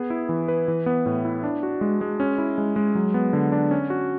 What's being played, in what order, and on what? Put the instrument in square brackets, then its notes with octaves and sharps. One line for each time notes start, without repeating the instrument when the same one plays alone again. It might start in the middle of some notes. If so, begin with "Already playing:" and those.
Already playing: [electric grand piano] B3 G#4
E4
E3
B4
E3
B3
A2
E4
D4
F#4
G#3
G#3
C#4
E4
G#3
G#3
F#3
B3
D3
D4
C#4
F#4